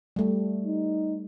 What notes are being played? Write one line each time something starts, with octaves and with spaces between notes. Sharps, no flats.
G3 A3
D#4